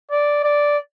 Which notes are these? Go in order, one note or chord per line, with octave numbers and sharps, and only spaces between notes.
D5
D5